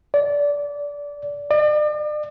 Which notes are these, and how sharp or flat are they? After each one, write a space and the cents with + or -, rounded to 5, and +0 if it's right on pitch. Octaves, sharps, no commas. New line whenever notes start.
D5 -20
D5 +40